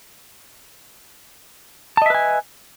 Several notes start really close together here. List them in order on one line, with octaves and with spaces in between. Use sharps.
A5 D#5 E5 B4 G#5